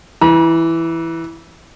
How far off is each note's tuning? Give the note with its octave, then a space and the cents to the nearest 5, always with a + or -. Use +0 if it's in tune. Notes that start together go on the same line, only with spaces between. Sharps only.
E3 +0 B5 -45